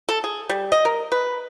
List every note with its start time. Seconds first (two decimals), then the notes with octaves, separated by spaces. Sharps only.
0.09 A4
0.24 G#4
0.49 G3
0.72 D#5
0.85 A#4
1.12 B4